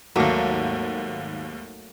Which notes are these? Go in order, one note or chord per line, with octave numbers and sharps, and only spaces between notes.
G#1 D#2 F#3 A3 A#3